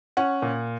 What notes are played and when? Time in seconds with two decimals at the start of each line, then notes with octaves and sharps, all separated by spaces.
0.17 C#4 F#5
0.42 A#2